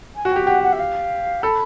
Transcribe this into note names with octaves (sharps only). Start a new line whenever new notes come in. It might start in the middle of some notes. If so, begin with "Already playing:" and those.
G#5
F#4
G4 G5
G4 F#5
F#5
E5
F5
A4 B5